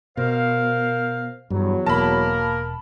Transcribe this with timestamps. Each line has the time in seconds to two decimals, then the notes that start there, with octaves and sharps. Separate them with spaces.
0.17 B2 A#4 C5 F5
1.50 E2 G2 F#3
1.86 E1 A#3 A#4 A5 B5